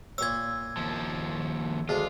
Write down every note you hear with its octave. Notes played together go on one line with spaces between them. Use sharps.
A#2 C#5 E6 G#6
D#2 F3
D2 G#3 D4 F4